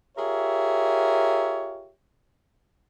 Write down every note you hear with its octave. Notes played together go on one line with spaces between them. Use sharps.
F4 G4 G#4 A#4 C#5 E5